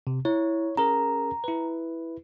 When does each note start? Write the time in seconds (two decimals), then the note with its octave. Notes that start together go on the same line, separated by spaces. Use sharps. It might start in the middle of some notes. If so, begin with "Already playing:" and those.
0.07 C3
0.25 E4 C#5
0.77 C#4 G#4 A#4 A#5
1.44 E4 B4